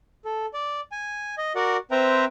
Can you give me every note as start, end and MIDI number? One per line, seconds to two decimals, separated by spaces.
0.25 0.46 69
0.54 0.81 74
0.92 1.35 80
1.38 1.53 75
1.55 1.77 66
1.55 1.77 70
1.55 1.77 74
1.55 1.77 78
1.91 2.25 60
1.91 2.25 71
1.91 2.25 72
1.91 2.25 76
1.91 2.25 79
1.91 2.25 82